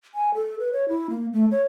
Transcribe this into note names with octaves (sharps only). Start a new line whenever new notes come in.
G#5
A4
B4
C#5
E4
A#3
A3
C#5